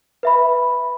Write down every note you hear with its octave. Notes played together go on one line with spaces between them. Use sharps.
B4 E5 B5